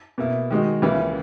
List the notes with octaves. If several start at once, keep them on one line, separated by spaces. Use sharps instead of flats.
B2 A#3 E4
D#3 G#3 D#4 F#4
C#2 C#3 E3 A#3 E4